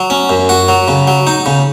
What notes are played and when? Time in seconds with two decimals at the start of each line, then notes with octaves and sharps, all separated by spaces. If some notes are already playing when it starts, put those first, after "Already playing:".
Already playing: F#3
0.10 C#4
0.29 F#2
0.49 F#4
0.68 F#3
0.88 C#3
1.07 F#3
1.27 D#4
1.46 C#3